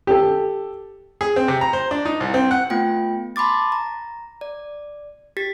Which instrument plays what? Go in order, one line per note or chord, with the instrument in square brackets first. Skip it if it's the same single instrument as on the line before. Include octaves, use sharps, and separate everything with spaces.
[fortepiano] G4 A4
G#4
C4
C3
A#5
C5
D4
D#4
C2
C4
F#5
[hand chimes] A3 B3 F4 G5
A5 B5 C6 D6 A6
A#5
D5
G4 A6 B6